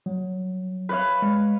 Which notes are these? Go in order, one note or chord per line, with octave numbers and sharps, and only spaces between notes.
F#3
B4 C#5 F5
G#3